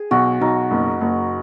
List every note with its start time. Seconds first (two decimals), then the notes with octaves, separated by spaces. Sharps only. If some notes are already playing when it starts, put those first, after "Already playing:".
Already playing: G#4
0.11 B1 F#4
0.41 B1 D#4
0.71 F#1
1.01 F#1